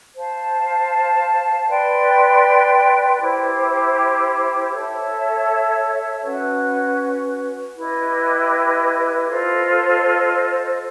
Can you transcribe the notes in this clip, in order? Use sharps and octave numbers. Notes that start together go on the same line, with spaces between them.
C5 F5 A5
B4 D5 G5 C6
E4 G4 C5
A4 C#5 E5 A5
C#4 F#4 B4
E4 G4 B4 D#5
F4 A4 C5 D#5